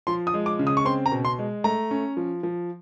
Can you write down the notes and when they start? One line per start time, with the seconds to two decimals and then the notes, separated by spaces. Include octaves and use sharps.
0.07 F3 C6
0.27 D#6
0.34 G#3
0.46 D6
0.59 C#3
0.67 D#6
0.77 C#6
0.85 C4 C6
1.06 A#5
1.12 B2
1.25 C6
1.39 G#3
1.64 A3 A#5
1.91 C#4
2.17 F3
2.43 F3